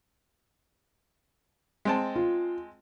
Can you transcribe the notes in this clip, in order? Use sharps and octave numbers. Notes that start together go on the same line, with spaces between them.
G#3 C4 A5
F4